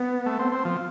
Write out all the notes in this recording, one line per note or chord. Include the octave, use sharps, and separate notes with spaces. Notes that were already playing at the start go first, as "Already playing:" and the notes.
Already playing: B3
A3
C4
C4
F3